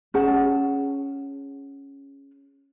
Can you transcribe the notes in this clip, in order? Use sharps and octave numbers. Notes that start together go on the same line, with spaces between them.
C#4 G#4 F#5 A5